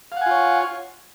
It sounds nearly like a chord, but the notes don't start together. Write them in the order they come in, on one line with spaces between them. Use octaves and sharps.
F5 F#5 G#5 F4 C#5